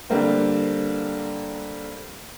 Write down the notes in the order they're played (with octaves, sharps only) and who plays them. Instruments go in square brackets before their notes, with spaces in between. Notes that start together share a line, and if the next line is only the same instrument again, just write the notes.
[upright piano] D3 G3 A#3 C4